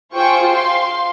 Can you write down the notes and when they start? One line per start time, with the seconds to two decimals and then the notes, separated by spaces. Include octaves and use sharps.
0.15 F4 G#4 C5 G5 C#6
0.50 F5 C6